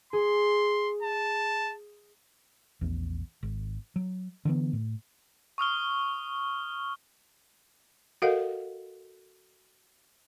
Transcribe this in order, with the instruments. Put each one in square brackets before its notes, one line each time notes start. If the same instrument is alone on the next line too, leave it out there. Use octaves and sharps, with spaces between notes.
[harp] G#4 [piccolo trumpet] C6
[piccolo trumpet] A5
[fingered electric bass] A#1 E2
G#1
F#3
D3 E3 B3
A2
[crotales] C#6 D#6 F6 G7
[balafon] F#4 A4 A#4 D#5 F5 F#5